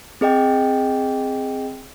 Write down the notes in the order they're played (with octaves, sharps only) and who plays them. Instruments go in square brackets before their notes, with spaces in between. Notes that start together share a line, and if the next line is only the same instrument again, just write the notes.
[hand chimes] C4 G#4 D#5 G5